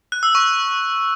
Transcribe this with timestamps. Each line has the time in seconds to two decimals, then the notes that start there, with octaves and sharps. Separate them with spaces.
0.12 F#6
0.23 E6
0.35 C#6